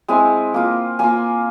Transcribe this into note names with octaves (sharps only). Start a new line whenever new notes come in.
G#3 C4 E4 G#5
A#3 F4
A#3 F4 G#5